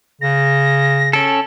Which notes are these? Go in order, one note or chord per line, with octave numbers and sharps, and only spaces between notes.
C#3 A#6
C#4 A4 D7